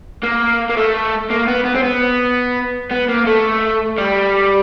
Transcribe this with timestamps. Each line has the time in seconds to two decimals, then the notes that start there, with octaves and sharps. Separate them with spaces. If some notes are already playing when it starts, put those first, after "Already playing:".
0.23 A#3
0.69 A#3
0.77 A3
1.30 A#3
1.47 B3
1.65 B3
1.75 C4
1.83 B3
2.91 B3
3.08 A#3
3.26 A3
3.98 G3